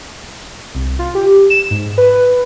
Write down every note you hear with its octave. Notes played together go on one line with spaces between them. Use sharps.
C2
F4
G4
E7
G#2
B4